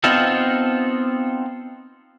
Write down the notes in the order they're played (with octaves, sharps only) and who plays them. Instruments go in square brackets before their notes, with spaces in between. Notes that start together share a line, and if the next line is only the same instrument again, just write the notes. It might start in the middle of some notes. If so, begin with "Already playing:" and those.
[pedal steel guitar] B3 C4 D#4 F4 A4